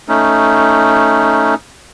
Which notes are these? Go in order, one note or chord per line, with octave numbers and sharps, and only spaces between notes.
A3 C#4 D#4